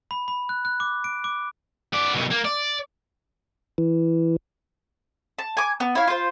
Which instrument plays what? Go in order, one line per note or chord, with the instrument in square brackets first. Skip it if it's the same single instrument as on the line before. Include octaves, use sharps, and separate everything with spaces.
[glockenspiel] B5
B5
F#6
F#6
D6
D7
D6
[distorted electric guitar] B3 D5
C2 B2
A#3
D5
[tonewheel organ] E3
[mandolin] A5
G#5 D6
B3
E4 C#5 F5
F4 C5